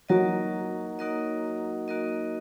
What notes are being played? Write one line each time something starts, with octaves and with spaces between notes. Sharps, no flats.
F#3 A#3 D#4 F#4 A#4 D#5
A#3 D#4 F#4 A#4 D#5
A#3 D#4 F#4 A#4 D#5